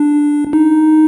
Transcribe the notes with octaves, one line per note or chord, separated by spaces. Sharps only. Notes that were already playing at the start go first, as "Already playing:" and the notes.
Already playing: D4
D#4